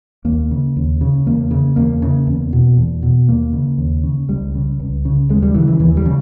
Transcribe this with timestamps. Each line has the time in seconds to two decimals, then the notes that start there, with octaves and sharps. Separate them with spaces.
0.25 D#2 A#3
0.51 C#3
0.76 D#2
1.01 C#3
1.26 E2 A#3
1.51 C#3
1.76 E2 A#3
2.02 C#3
2.27 E2
2.53 B2
2.77 E2
3.03 B2
3.28 D#2 A#3
3.53 C#3
3.78 D#2
4.03 C#3
4.29 C#2 G3
4.55 C#3
4.79 C#2
5.05 C#3
5.29 D#2 G#3
5.42 G3
5.54 C#3 E3
5.68 E3
5.80 D#2 E3
5.97 G3
6.06 C#3